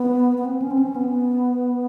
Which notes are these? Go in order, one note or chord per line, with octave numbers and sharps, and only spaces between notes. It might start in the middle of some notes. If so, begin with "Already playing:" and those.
Already playing: B3
B3
C4
C#4
C4
C#4
B3